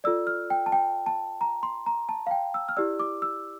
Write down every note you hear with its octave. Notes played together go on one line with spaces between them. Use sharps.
F4 A4 D5 E6
F6
G5
A5
G5
A5
A#5
C6
A#5
A5
F5
G5
E6
F6
E4 G4 D5 E6
D6
E6